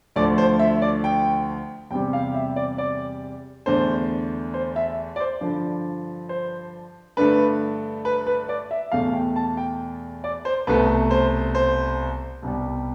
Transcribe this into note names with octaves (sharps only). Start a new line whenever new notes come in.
D2 D3 F3 A3 D5
C5
E5
D5
G5
E2 C3 G3 G5
F5
E5
D5
D5
E2 D3 A3 C5
C5
E5
D5
C5
G2 D3 F3
C5
G2 D3 A3 B4
B4
B4
D5
E5
E2 B2 A3 F5
G5
A5
G5
D5
C5
C2 B2 A3 B4
C5
C5
C2 B2 G3